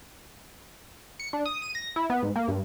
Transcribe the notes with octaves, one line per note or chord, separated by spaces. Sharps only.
C#7
D4
D#6
D#7
A#6
E4
B3
G#2
A#3
G2